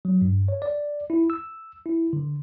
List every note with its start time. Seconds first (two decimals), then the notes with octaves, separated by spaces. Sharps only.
0.05 F#3
0.22 G2
0.48 C#5
0.62 D5
1.10 E4
1.30 E6
1.86 E4
2.13 D3